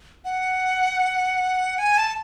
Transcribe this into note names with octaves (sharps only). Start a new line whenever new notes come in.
F#5
G#5
A5